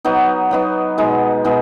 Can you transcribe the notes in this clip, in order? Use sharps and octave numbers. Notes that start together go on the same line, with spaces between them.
F#3 B3 D#4
F#3 B3 D#4
B2 G#3 D#4
B2 G#3 D#4